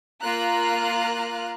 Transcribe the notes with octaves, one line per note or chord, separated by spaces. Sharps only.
A#3 F4 F5 A#5 F#6